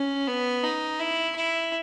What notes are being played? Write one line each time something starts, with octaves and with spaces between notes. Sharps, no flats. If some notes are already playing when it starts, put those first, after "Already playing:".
Already playing: C#4
B3
D#4
E4
E4